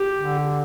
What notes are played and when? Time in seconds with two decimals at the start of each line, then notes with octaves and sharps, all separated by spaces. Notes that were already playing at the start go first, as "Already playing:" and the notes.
Already playing: G4
0.18 D3